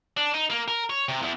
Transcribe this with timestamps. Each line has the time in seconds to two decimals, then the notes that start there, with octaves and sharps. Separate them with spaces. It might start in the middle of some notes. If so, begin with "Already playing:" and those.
0.17 D4
0.34 D#4
0.50 A#3
0.68 A#4
0.90 C#5
1.09 C3
1.22 E2